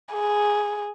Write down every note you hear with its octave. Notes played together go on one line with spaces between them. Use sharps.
G#4